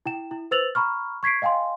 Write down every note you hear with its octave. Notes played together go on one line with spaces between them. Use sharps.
E4 G5 E7
E4
B4 C5 E6 A6 F7 F#7
A#5 B5 C#6 F6
C#6 G#6 B6 C7 D7
D#5 F5 G5 G#5 C6